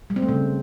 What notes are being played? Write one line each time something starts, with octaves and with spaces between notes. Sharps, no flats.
G3
C4
A3
C#3